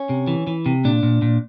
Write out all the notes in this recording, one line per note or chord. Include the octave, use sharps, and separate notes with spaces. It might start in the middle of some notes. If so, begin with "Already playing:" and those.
Already playing: C#4
C3
E3
E3
C3
A#2 D4
A#2
A#2